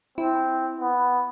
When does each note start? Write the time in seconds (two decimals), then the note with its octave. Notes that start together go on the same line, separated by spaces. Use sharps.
0.18 C4 E4
0.80 B3